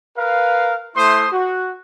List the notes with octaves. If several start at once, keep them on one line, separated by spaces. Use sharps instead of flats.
A#4 B4 F5
A3 E4 C5 C6 D#6
F#4